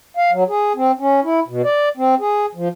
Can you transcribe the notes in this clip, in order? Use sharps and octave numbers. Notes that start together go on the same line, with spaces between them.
F5
F#3
G#4
C4
C#4
E4
B2
D5
C4
G#4
F3